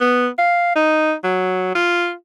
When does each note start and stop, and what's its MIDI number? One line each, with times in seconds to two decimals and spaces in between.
0.01 0.28 59
0.38 0.73 77
0.76 1.14 63
1.24 1.72 54
1.75 2.13 65